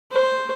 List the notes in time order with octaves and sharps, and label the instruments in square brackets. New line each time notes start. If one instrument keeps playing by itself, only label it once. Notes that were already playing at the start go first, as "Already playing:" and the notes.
[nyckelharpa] C5